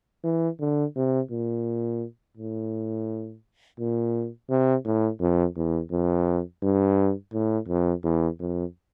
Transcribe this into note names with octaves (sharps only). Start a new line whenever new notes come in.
E3
D3
C3
A#2
A2
A#2
C3
A2
F2
E2
F2
G2
A2
F2
E2
F2